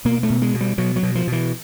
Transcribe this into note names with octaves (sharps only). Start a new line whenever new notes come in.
B2 A#3
A3
B2
G#3
B2
G3
B2 F#3
F#3
B2
F3
B2 E3